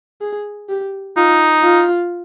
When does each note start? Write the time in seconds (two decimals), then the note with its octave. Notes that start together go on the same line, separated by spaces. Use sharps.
0.21 G#4
0.69 G4
1.17 D#4 F4
1.64 F4